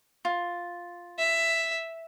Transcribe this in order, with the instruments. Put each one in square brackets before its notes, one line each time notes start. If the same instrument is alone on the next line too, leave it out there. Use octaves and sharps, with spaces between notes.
[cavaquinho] F4
[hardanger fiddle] E5